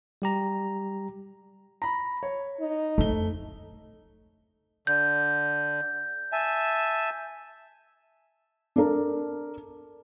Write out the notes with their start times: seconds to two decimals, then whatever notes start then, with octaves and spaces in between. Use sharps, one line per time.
0.22 G3 G4 A#5
1.82 A#5 B5
2.23 C#5
2.61 D#4
2.98 F2 A3 G7
4.87 D3 G6
6.32 E5 G#5 A5
8.76 D4 A4 A#4